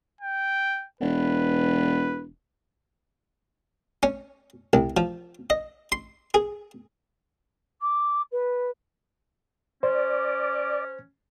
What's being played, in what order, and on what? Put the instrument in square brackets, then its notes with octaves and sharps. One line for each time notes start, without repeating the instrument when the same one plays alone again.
[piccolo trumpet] G5
[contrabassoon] E1 [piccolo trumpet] B4
[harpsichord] C#4
C2
F3
D#5
C6
G#4
[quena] D6
B4
[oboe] C#4 [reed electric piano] C5 [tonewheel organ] D5